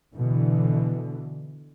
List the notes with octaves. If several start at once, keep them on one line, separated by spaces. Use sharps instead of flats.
B2 D3 E3